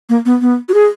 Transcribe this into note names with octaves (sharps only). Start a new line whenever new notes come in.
A#3
B3
B3
F#4
G#4